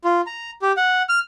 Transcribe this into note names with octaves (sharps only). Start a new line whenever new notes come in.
F4
A#5
G4
F#5
F6